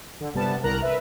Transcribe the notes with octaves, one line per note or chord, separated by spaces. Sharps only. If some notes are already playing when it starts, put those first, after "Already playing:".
D3
G1 C3 G3 B3 A5
C2 A#4 A#5 F#6
B4 E5